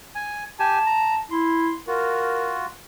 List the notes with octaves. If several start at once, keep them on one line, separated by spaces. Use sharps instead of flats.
G#5
G4 G#5 A5
A#5
E4 C6
F4 F#4 A#4